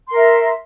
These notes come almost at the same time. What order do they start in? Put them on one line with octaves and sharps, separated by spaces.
C6 A#4 E5